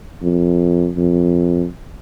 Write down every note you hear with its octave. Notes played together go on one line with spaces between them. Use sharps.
F2
F2